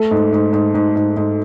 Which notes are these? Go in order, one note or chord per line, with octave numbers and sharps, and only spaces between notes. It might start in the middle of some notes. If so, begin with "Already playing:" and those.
Already playing: A3 A4
G#2
G#2
G#2
G#2
G#2
G#2